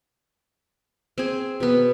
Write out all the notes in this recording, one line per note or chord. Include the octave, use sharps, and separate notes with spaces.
C4 G#4
B2 B3